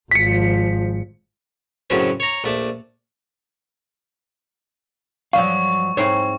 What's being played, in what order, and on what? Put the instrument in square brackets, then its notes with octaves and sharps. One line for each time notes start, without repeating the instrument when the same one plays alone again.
[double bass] G#1 F3 [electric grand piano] B6 C#7
[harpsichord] F#2 A2 C#3 F#3 C4 C#4
C#5 A#5
A#1 A3 D5 A5
[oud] G2 F3 F#3 [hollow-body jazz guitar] F5 [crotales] C#6
[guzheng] G#2 C4 E4 [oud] C#5